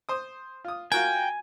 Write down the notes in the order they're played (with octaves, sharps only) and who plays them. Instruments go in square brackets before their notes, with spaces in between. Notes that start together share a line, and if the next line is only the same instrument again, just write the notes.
[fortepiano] C5 D#6
F4 D#6
[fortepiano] F4 F#4 A#4 [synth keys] G5 [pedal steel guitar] G#5